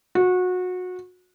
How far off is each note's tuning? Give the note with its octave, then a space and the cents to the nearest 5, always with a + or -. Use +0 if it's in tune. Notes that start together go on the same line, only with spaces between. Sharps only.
F#4 -25